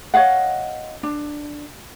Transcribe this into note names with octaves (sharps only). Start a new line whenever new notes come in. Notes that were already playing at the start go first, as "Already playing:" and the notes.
C#5 D#5 F5 F#5
D4